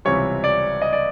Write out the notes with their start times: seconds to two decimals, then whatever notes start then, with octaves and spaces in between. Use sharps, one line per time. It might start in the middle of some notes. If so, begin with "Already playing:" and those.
0.05 C#2 C3 E3 G3 C#5
0.44 D5
0.82 D#5
0.93 D5